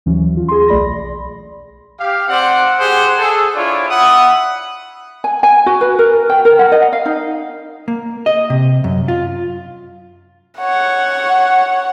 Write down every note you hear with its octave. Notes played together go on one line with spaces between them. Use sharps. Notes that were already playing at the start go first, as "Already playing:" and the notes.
D#2 E3 F#3 C#4
F4
G#4 C6
B1 A3 D5 B5 A#6
G4 F5
C4 C5 D5 F#5
G4 G#4 C5 F#5
G#4 A4
D4 E4 F4 C#5 D5
E5 F#5 B5 D#6
G#5
G#5
F#4
B4
A#4
G5
A#4
F#5
D#5
F5
D#4
A#3
D#5
C3
F#2
F4
C#5 F#5